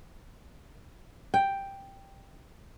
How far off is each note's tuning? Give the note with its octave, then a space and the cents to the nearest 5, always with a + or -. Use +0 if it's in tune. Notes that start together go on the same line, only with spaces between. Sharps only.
G5 +5